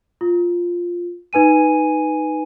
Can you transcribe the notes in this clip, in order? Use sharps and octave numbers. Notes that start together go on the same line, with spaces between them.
F4
D#4 B4 G#5 D#7